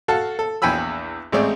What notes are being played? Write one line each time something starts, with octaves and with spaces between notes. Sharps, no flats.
F#4 A4 F5 A5
A4
A#1 E2 G5 G#5 B5 E6
A1 G#3 A3 C4 D5